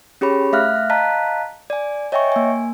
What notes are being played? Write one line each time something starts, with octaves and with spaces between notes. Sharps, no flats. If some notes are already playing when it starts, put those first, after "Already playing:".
C#4 G4 G#4 C#5 B5
A3 E5 F5 F6 F#6
D#5 F5 A5 A#5 F#6 B6
D5 G#5
C#5 D#5 E5 G5 G#5 C#6
A#3 G#5